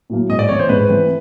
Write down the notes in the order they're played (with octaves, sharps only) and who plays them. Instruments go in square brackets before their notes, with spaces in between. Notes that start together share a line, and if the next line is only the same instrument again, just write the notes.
[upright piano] A2 F#3 A#3
[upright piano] G#2 [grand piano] D#5
[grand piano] D5
[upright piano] E3 A3 C4 [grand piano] C#5
[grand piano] C5
[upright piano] G#2 [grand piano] B4
[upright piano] E3 A3 C4